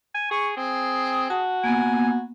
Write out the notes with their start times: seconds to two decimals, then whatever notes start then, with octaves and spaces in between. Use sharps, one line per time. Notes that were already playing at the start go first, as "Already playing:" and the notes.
0.15 G#5
0.31 G#4 C#6
0.57 C4 G#4
1.30 F#4 A5
1.64 A#3 B3 G#5